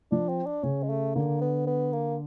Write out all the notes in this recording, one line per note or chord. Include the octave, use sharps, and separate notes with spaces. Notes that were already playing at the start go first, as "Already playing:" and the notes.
F3 D4
C4
D4
C#3 C#4
G#3
A3
D3 A#3
B3
B3
A#3